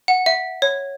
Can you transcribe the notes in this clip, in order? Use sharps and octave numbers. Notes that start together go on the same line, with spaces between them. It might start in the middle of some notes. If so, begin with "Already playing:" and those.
F#5
E5
C#5